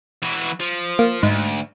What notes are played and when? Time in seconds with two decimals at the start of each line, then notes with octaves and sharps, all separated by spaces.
0.23 E3 F#4
0.60 F3
0.99 A#3
1.23 D2 G#2